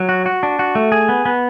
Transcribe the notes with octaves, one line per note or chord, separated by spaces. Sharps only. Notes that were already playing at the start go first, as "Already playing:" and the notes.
Already playing: F#3
F#4
F#4
D4
F#4
A3
G#4
B3
B3